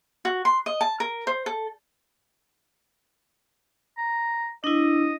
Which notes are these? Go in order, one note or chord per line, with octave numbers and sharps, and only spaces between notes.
F#4
C6
D#5
A5
A#4
C5
A4
A#5
D4 E4 D#5